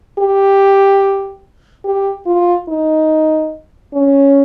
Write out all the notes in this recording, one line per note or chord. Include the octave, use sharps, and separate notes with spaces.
G4
G4
F4
D#4
C#4